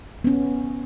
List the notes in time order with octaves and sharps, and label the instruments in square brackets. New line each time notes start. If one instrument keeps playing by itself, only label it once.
[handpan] B3 C#4